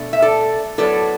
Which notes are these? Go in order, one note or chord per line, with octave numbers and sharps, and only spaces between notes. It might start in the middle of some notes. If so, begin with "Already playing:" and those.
Already playing: B2 A3 D4
E5
A4 D5
A2 F#3 B3 A4 D5